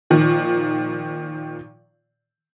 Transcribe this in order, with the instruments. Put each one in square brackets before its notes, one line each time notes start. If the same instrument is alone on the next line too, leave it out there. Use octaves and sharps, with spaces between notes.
[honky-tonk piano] A#2 D#3 F3